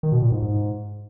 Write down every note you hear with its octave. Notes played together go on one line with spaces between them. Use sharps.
D#3
B2
A#2
G#2
G#2